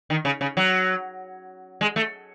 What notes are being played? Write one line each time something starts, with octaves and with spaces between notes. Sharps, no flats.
D#3
C#3
C#3
F#3
G#3
A3